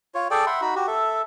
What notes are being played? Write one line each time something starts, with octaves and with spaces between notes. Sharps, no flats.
F4 C#5
G#4 A4 D5 G5
E5 F#5 B5 C6
D#4 F#4 B5
F#4 G4
A4 E5